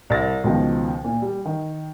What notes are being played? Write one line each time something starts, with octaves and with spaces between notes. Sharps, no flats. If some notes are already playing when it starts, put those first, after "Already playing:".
C2 A6 A#6
C#2 B2 D#3 F3
A#2
G3
D#3